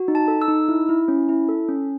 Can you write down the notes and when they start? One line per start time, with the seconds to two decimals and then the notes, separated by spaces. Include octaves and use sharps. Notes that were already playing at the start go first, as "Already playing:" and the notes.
Already playing: F#4
0.08 D#4
0.15 A5
0.28 A4
0.42 E6
0.48 D#4
0.68 E4
0.89 E4
1.08 C#4
1.29 E4
1.49 A4
1.69 C#4